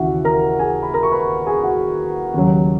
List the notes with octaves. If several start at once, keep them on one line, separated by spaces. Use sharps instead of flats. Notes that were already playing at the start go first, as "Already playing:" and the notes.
Already playing: D#2 C#3 E3 F#4 E5 F#5
A#4 A#5
G#4 G#5
B5
A#4 A#5
C#6
B4 B5
G#4 G#5
F#4 F#5
D#2 C#3 F#3